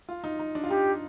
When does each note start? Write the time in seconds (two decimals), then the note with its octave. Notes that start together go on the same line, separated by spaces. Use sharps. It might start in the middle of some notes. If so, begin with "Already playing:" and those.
0.09 F4
0.24 D#4
0.39 D#4
0.55 D4
0.64 F4
0.70 D#4 G4